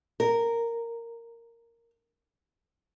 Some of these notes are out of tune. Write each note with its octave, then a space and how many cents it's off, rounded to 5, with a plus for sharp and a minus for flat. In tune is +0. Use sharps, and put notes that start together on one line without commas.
A#4 -10